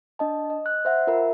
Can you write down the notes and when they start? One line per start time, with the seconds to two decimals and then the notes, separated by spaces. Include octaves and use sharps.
0.19 D4 D#5 A5
0.50 D#5
0.66 F#6
0.85 C5 E5 F#5
1.07 F4 A#4 E5